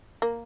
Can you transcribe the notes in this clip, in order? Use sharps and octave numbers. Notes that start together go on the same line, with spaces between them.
A#3